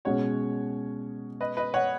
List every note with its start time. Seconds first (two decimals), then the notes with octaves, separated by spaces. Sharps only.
0.05 B2 G#3 C#4 C#5 F#5
1.41 B4 D#5
1.57 B4 D#5
1.74 C#5 F#5